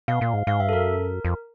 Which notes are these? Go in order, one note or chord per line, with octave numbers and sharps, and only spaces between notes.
B2 F5
A#2
G#2
G#2 F5
G2 E5
A4
F#2 A#4
F2